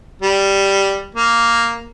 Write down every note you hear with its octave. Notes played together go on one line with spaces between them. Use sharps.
G3
A#3